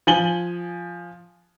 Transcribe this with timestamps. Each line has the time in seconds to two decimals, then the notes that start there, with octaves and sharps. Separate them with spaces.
0.07 F3 G#5 F#7 G7